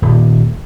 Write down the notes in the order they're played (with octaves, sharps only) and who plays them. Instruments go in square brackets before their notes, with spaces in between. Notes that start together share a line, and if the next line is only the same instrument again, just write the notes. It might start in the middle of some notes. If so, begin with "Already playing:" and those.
[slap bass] D#1